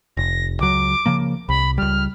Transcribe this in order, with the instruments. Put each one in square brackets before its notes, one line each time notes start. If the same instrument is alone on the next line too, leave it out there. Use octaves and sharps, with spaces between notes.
[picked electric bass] F1 [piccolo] A#6
[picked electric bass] C#2 F#3 [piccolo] D6
[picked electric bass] C#3 F3 A#3
[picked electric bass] C2 [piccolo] B5
[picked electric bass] C#2 G3 [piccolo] F6